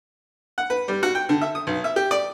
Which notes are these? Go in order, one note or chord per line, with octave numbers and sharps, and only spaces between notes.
F#5
B4
G3
F#4
G5
D3
E5
D#6
B1
E5
G4
D5